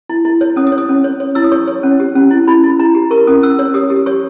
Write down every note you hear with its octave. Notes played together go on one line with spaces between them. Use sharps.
E4
E4
C#5
C#4 D#6
D#6
C#5
D#6
C#4
C#5
C#5
E4 E6
D#6
C#5 C#6
C#5
C#4
G4
C#4
E4
E4 B5
E4
E4 A#5
G4
A#4 C#6
C#4 D#6
C#4 E6
C#5 E6
G4 D#6
G4
C#5 C#6